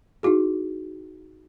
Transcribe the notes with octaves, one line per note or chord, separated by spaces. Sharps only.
D#4 E4 F#4 G#4